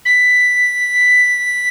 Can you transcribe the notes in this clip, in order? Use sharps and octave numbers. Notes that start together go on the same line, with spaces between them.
B6